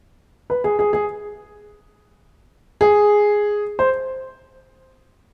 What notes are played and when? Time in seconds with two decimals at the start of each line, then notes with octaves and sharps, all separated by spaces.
0.50 B4
0.64 G#4
0.79 G#4
0.93 G#4
2.81 G#4
3.79 C5